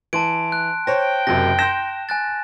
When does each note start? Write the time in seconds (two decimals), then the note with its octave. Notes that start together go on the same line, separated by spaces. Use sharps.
0.13 E3 A5 C6 D7
0.52 F#6
0.87 C5 C#5 G5 A#6
1.27 F#1 F#2 C3 A#6
1.59 C6 G6 A#6 E7
2.09 G#5 F#6 A6